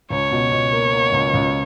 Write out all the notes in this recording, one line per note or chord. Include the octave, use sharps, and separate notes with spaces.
C#2 C#5
B2
B2
A#3
A#3
C#2
C#2